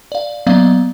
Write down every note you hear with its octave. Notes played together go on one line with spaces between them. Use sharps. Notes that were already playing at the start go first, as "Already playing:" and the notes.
D5 F5
F#3 A#3 B3 D5 D#5 F5